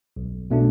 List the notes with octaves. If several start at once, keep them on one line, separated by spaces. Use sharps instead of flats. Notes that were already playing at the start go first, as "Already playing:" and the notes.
B1
B2 A3 D4